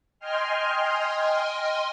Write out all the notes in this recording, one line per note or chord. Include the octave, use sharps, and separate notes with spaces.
D#5 G5 G#5 C6 F6